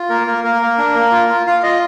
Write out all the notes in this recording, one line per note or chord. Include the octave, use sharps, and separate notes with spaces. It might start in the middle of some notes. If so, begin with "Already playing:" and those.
Already playing: F4
A#3 A#4
A#3 A#4
A#3 A#4
A#3
D4
A#3
F4
F4
F4 F5
F4 D#5